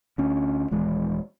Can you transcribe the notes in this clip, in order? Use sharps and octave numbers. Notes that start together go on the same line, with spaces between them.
D2 C#4
D#1 E3 G#3